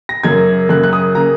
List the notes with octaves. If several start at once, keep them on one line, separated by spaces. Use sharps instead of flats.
A#6
F#2 C#3 A#3 G#6
F#2 C#3 A#3 F#6
F#6
D#6
C#3 A#3 A#5